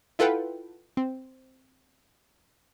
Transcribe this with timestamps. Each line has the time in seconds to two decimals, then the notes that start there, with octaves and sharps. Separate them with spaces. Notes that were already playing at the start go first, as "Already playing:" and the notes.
0.19 E4 F4 A4 B4 F#5 G5
0.97 C4